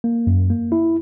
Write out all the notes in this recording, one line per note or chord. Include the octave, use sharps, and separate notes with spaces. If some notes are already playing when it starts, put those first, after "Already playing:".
A#3
F#2
A#3
E4